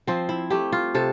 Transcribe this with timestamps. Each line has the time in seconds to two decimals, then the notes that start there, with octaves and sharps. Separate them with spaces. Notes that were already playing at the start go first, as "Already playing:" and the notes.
0.07 F3 C4
0.29 E4
0.50 A3 G4
0.72 F4
0.95 C3 A4